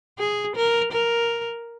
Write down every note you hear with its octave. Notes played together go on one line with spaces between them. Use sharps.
G#4
A#4
A#4